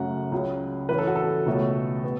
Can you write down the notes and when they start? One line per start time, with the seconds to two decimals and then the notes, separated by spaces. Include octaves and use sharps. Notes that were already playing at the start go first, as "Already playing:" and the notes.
Already playing: F#2 C#3 A3 C#4 F#4 F#5
0.32 C#2 C#3 F#3 C#4
0.89 A2 E3 C#4 B4
0.98 A4
1.07 F#4
1.16 A4
1.46 C#2 B2 A3 C#4
2.04 B3